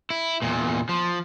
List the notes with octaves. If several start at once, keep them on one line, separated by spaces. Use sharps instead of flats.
E4
E2 A#2
F3